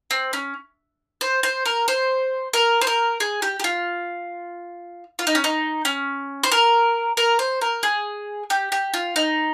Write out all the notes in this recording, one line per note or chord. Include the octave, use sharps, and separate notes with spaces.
C4
C#4
C5
C5
A#4
C5
A#4
C5
A#4
G#4
G4
G4
F4
F4
D#4
C#4
D#4
C#4
C5
A#4
A#4
C5
A#4
G#4
G4
G4
F4
D#4